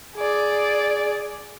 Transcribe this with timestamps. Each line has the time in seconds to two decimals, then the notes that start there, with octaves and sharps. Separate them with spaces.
0.16 G#4 D5